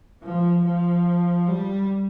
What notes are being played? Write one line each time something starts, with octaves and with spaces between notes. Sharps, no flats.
F3
F3
G3